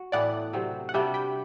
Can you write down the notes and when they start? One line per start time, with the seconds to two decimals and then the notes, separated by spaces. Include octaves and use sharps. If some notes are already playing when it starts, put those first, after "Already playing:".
Already playing: F#4
0.12 A2 E3 B3 D5 F#5
0.53 C3 F#3 C4
0.89 F#5
0.94 C3 G3 D4 F#4 E5 G5
1.14 G5 B5